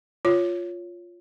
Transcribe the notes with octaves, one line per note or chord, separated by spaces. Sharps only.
F4 C#5